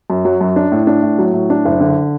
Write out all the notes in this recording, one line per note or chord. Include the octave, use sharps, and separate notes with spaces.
F#2
F#3
F#2
D4
A2
D4
A2
F#3
A2
D4
F#1
D3